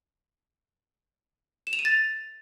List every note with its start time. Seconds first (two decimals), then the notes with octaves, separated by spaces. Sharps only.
1.67 E7
1.73 F7
1.79 D#7
1.85 A6